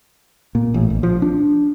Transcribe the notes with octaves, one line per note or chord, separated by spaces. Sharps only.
A#2
A1
A#1
F3
D4